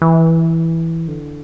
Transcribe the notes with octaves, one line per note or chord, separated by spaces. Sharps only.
E3
D3